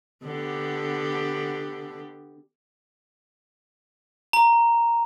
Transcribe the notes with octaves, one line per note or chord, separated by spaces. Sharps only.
D3 B3 G4
A#5